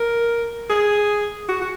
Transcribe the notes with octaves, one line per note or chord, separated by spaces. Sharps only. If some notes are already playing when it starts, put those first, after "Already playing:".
Already playing: A#4
G#4
F#4
F#4